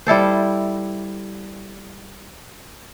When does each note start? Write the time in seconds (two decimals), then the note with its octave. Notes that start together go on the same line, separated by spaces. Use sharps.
0.07 G3 E4 A4 C5